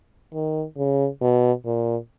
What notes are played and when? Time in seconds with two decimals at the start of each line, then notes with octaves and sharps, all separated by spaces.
0.33 D#3
0.77 C#3
1.21 B2
1.65 A#2